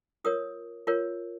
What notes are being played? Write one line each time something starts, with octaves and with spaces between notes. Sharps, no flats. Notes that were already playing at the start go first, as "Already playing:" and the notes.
F4 A#4 C#5 D#6
F4 A#4 C#5